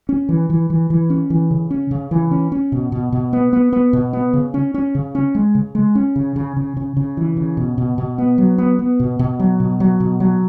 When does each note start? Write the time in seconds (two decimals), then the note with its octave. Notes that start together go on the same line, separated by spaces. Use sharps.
0.09 C#4
0.29 E3
0.50 E3
0.70 E3
0.90 E3
1.10 C#4
1.30 E3
1.51 C#3
1.71 C#4
1.91 C#3
2.11 E3
2.31 C#4
2.52 C#4
2.72 B2
2.92 B2
3.12 B2
3.33 B3
3.53 B3
3.73 B3
3.93 B2
4.13 B3
4.33 C#3
4.54 C#4
4.74 C#4
4.95 C#3
5.15 C#4
5.35 G#3
5.55 C#3
5.75 G#3
5.95 C#4
6.16 C#3
6.36 C#3
6.56 C#3
6.77 C#3
6.97 C#3
7.17 E3
7.37 C#3
7.57 B2
7.78 B2
7.98 B2
8.18 B3
8.38 F#3
8.58 B3
8.79 B3
9.00 B2
9.19 B2
9.40 F#3
9.60 B2
9.80 F#3
10.00 B2
10.20 F#3